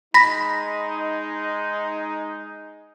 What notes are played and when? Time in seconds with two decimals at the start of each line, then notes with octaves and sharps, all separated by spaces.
0.14 G#3 D#4 B5 A#6 B6